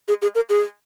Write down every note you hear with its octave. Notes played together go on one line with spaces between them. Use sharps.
G#4
G#4
A#4
G#4